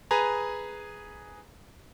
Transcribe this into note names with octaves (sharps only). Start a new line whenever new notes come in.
G#4 B4 G#5 A#5